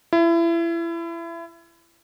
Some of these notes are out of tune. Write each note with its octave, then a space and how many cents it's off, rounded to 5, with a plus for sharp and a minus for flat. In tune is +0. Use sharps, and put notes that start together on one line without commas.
E4 +30